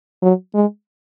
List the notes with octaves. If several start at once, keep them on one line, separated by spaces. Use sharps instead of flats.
F#3
G#3